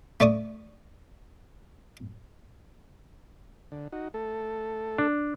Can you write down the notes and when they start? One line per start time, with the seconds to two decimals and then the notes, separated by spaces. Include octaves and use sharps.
0.20 A3 D5 C#6 D#6
3.72 D3
3.92 D#4 F#4
4.14 A3 A4
4.98 D4